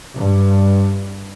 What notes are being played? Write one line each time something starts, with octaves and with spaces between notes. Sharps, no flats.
G2